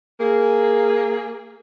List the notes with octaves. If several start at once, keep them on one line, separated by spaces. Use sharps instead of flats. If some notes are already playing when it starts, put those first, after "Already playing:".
A#3 G#4